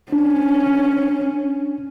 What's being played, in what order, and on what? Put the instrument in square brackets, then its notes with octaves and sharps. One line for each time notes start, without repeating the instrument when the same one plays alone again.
[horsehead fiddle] C#4 [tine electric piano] D4